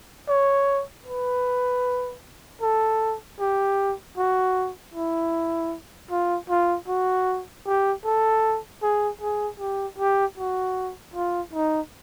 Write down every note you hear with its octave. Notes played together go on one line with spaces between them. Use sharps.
C#5
B4
A4
G4
F#4
E4
F4
F4
F#4
G4
A4
G#4
G#4
G4
G4
F#4
F4
D#4